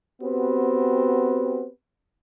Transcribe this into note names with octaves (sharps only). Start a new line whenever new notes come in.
B3 C4 F#4 G4 B4